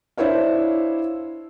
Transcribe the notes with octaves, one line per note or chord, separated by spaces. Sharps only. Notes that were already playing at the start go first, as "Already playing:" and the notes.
D4 E4 C5 C#5 F5